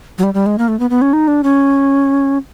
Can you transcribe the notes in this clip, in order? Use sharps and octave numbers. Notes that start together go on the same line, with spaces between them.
F#3
G3
G3
G#3
A#3
A3
B3
B3
C#4
D#4
D4
C#4